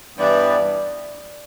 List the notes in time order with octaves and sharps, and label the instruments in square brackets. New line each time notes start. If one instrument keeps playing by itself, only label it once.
[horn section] G2 E3 B3 [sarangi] D5